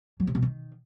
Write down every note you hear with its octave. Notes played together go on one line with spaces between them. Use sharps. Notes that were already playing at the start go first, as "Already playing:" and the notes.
F#3
C3
B2
D#3